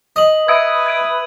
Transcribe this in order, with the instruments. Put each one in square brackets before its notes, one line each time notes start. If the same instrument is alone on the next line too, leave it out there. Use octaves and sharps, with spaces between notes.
[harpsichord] D#5 [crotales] D#6 F#7
[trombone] B4 [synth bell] E5 D#6 E6 [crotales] G#6 D7 D#7
[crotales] G#6 D7